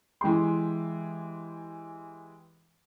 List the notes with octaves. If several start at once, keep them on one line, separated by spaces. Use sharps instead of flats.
E3 G#3 G4 C6